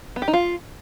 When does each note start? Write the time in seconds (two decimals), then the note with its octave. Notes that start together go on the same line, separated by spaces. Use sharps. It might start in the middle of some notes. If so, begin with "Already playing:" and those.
0.16 B3
0.22 G4
0.28 D#4
0.33 F4